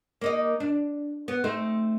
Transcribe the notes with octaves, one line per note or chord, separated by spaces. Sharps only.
A#3 D#4 D#5
D4
B3
A3 C4 D#4